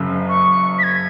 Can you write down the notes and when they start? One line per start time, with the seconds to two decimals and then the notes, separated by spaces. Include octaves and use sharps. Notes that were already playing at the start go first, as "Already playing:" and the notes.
Already playing: F#1 F#2 C#3
0.29 C#6
0.79 B6
0.83 G#6